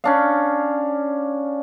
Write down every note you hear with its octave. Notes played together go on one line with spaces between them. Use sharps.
C#4 D4 F5